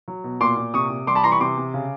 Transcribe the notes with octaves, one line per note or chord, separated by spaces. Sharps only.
F#3
B2
A#2 C6 D6
A#2
C3 C#6 D#6
C3
G3 C6 D6
A5 B5
E3 A#5 C6
B5 C#6
C3 C6 D6
C3
C#3